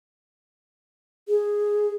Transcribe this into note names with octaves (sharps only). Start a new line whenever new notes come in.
G#4